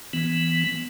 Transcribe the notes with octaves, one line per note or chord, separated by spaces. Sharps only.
E3 B3